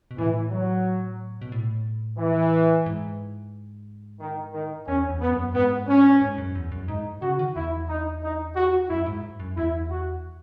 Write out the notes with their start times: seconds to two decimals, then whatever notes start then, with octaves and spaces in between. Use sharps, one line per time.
0.11 B2
0.18 A2 E3
0.51 F#3
1.42 B2
1.52 A2
2.19 E3
2.86 G#2
4.20 D#3
4.54 D#3
4.87 E2 C#4
5.10 E2
5.21 B3
5.32 F#2
5.54 G#2 B3
5.87 C#4
6.21 G#2
6.38 F#2
6.55 E2
6.72 F#2
6.88 G#2 D#4
7.22 C#3 F#4
7.39 D#3
7.56 E2 E4
7.89 D#4
8.22 D#4
8.56 F#4
8.90 F#2 E4
9.06 G#2
9.40 F#2
9.57 E2 E4
9.91 F#4